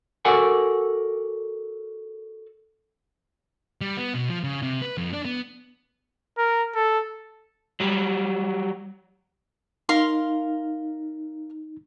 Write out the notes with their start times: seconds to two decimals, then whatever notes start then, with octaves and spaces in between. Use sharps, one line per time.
0.25 F#4 A4 A#4 D5 F#5 G#5
3.81 G3
3.97 B3
4.14 B2
4.29 F3
4.44 C#3
4.62 C3
4.82 B4
4.98 F2
5.13 D4
5.25 B3
6.38 A#4
6.75 A4
7.80 F#3 G3
9.89 D#4 A#4 F5 C6